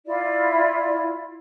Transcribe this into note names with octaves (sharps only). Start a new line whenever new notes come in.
E4 F4 D5